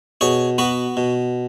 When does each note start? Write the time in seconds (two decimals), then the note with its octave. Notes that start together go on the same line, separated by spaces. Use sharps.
0.21 B2 G#4 C#5
0.58 B3 F#4 B4
0.97 B2